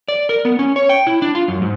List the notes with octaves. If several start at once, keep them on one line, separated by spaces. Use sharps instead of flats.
D5
A#4
B3
C#4
C#5
G5
E4
D4
F4
F#2
G#2